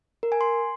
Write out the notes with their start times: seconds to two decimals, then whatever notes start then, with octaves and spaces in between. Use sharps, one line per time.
0.23 A#4
0.32 G#5
0.41 C6